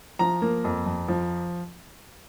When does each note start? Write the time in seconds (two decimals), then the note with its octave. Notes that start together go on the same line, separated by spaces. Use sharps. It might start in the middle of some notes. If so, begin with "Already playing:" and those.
0.19 F3 A#5
0.42 A#3
0.64 F2
0.86 F2
1.08 F3